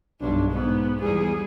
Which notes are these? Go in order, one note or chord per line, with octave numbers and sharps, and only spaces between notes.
B1 G2 D4
G#2 B3
E2 G3 G#4